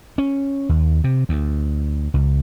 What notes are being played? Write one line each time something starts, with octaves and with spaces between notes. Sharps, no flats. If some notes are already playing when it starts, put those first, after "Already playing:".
C#4
D#2
C3
D2
C#2